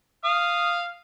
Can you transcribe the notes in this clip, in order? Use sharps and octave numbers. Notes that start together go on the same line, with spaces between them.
F5 D#6 F6